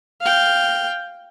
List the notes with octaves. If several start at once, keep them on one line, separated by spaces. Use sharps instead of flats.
F5 G5